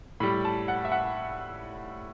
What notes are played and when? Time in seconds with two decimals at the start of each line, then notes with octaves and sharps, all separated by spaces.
0.20 A2 G3 B5
0.45 A5
0.68 F#5
0.85 E5
0.92 F#5